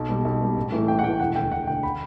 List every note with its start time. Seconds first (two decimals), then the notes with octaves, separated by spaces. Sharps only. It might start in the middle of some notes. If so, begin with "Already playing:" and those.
Already playing: B1
0.09 B2 G3
0.25 B1
0.41 B2 G3
0.57 A1
0.72 A2 E3
0.88 A1 G5
0.99 F#5
1.03 A2 E3 G5
1.20 E1 F#5
1.35 D2 D3 G5
1.51 E1 F#5
1.67 D2 D3 G5
1.83 B5